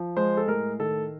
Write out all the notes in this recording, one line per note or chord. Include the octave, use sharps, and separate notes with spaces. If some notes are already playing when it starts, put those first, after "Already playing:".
Already playing: F3
G#3 C5
A4
A2 A#4
D#3 A4